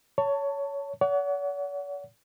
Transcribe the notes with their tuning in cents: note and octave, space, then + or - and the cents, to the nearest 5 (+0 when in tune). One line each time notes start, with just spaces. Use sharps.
C#5 +15 A5 +20
C#5 +45 F#5 +0